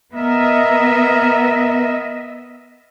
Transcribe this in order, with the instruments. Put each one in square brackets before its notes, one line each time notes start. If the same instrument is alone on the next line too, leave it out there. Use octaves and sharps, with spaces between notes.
[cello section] B3 D#5 E5 [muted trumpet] A#4